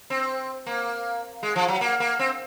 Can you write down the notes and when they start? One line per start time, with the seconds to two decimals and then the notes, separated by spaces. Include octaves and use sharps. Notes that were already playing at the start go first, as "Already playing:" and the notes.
0.10 C4
0.66 A#3
1.43 G#3
1.56 F3
1.68 F#3
1.81 A#3
2.00 A#3
2.19 C4